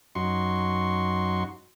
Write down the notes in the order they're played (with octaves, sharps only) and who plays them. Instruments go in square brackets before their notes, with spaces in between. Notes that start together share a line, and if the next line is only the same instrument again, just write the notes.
[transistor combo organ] F#2 D#4 F#4 C6 C#6